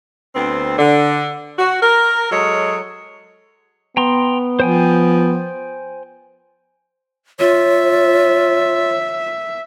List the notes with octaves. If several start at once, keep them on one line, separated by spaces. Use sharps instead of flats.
D2 B3 C4
D3
F#4
A#4
F#3 G#3 G#4 A4 C#5
B3 G5 A#5 C6
F3 C5 G5 G#5
F4 C#5 E5